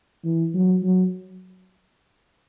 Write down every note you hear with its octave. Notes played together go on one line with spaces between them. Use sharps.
E3
F#3
F#3